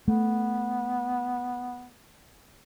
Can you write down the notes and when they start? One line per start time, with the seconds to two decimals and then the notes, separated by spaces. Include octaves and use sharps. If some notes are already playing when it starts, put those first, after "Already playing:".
0.08 A3 B3